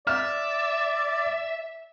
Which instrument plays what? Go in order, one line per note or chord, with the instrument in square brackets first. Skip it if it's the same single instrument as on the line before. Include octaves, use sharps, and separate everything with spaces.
[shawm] D5 [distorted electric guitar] E5 [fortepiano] F6